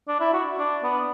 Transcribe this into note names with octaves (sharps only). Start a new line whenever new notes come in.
D4
E4
F#4
D4
B3